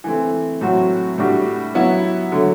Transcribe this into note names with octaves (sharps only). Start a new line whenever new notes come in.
E3 A3 C4
A2 F#3 C4 F#4
A2 G3 D4 F#4
F#3 B3 E4
D3 F#3 A3